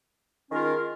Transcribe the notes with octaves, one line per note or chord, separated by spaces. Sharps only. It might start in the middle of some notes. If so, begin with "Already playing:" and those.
D#3 G#3 C#4 F4 A#4